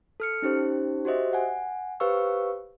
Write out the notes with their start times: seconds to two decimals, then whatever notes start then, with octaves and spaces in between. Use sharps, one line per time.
0.20 A4 F6 C#7
0.42 C#4 D#4 G4 C5
1.05 F#4 G4 C5 D#5 E5
1.33 F#5 G#5
2.00 G4 B4 C5 F5 C#6 E6